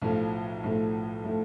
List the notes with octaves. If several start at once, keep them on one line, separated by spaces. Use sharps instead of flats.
B1 A2 F3 A3
B1 A2 F3 A3
A2 F3 A3